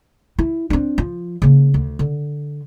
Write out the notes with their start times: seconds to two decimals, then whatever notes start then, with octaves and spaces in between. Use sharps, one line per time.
0.39 E4
0.70 C4 D4
0.98 F3
1.42 C#3 A#3
1.74 D2
1.99 D3